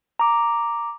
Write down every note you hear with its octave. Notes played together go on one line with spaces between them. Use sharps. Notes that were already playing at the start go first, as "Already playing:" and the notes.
A#5 D6